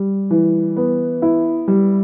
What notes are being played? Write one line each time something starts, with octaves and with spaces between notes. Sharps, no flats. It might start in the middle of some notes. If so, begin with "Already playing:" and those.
Already playing: G3
E3
B3
E4
G3